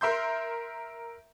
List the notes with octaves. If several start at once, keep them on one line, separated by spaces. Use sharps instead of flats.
A#4 E5 C6 G6